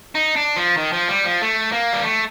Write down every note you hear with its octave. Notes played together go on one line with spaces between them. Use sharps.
D#4
D4
F3
D#3
F3
G3
F3
A3
A#3
G3
A3